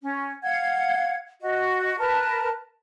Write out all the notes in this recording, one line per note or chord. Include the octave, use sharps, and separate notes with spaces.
C#4
F5 F#5 G#6
F#4 D#5
A#4 B4 A5